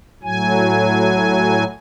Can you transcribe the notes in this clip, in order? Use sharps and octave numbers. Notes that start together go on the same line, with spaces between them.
A2 F#3 G#5